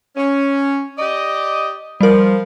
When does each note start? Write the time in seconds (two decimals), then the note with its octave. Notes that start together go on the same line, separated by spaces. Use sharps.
0.15 C#4
0.98 G4 D5 D#5
2.01 F3 G3 A#4